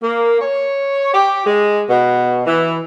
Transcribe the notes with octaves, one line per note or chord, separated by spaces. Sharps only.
A#3
C#5
G4
G#3
B2
E3